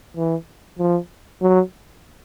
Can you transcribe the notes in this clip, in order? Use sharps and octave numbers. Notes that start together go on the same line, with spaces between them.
E3
F3
F#3